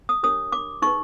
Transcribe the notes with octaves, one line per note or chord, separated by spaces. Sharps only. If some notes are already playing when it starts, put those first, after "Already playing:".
D#6
D4 G4 A#4 C#5 D#6
D6
D#4 G#4 B4 C#6